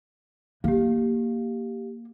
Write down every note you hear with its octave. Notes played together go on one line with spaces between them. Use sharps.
A#3 G4 F5